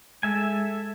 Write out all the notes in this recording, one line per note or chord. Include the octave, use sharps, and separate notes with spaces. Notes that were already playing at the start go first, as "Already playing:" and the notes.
G#3 A4 E5 G#5